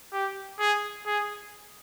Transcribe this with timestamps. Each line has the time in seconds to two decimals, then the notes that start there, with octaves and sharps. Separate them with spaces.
0.13 G4
0.59 G#4
1.06 G#4